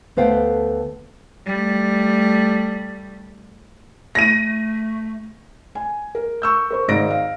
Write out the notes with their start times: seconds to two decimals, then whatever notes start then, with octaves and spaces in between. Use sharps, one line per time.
0.17 D2 A3 B3 C5 F5 G5
1.46 G3 A3
4.15 A3 A#6 D#7
5.75 G#5
6.15 A#4
6.42 C#6 E6 G6
6.71 A#4 C5 C#6
6.88 G#1 G#2 A#6 D7
7.10 F5